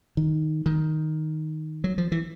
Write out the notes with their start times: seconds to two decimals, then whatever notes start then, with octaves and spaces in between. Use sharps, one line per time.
0.17 D#3
0.66 D#3
1.84 F#3
1.98 F3
2.12 E3